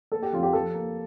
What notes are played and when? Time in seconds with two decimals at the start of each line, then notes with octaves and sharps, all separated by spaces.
0.12 A#3 A4
0.22 G4
0.33 F2 F4
0.43 G4
0.53 F3 A4
0.74 A#3